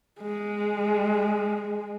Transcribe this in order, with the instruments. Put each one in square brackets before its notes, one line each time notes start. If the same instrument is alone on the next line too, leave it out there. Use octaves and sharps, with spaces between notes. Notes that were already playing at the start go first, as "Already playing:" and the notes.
[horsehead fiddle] G#3